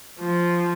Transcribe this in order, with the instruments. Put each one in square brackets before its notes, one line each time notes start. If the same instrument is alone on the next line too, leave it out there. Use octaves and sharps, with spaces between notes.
[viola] F3